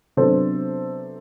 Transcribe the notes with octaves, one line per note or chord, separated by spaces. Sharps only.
C3 F#3 B3 D4 A4 C5